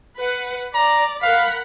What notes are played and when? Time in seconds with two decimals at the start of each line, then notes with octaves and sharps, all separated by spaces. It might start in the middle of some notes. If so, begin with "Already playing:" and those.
0.17 B4 F#5
0.74 D5 A#5
1.22 A#4 F5 F#5 B5